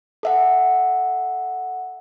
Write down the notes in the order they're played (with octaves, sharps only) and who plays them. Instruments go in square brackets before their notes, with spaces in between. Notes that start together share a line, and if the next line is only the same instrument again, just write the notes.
[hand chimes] A4 E5 F#5